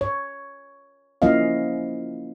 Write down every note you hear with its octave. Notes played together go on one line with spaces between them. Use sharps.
C#5
F3 A#3 C#4 E4 D#5 F5